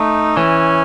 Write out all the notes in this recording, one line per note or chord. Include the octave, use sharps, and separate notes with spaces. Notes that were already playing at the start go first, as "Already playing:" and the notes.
Already playing: A3 D#4
E3 C#4